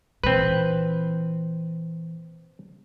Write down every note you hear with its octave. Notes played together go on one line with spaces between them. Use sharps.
A#2 E3 C4 B4